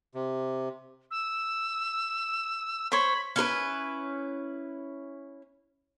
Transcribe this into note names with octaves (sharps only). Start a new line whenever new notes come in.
C3
E6
C5 C#5 B5
C#4 E4 A#4 B4